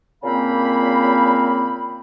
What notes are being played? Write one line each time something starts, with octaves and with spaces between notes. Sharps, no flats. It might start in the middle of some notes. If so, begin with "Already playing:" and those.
A#2 C#3 A#3 C4 F5 B5